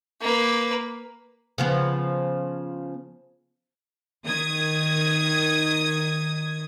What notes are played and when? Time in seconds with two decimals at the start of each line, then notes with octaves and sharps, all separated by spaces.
0.21 A#3 B4
1.58 C#3 F3 B3
4.26 D#3 D#6 G#6